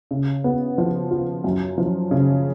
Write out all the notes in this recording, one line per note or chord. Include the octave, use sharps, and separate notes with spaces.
C#3
B3
F3
F4
F#2
F3
C#3